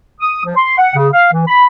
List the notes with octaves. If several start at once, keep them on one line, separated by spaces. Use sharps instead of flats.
D#6
F3
C6
F#5
C#3
F5
E3
B5